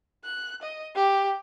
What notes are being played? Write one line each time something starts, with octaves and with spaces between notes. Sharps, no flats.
F#6
D#5
G4